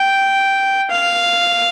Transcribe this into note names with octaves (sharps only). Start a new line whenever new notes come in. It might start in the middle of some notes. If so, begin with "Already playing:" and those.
Already playing: G5
F5